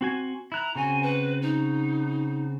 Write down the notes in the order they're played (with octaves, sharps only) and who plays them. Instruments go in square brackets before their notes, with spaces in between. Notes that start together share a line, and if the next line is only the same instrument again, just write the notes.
[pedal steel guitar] C4 F#4 G#5
[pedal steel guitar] E4 F#6 [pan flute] A#5
[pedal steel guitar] C#3 C4 F#4 [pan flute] G#5
[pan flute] B4
D#4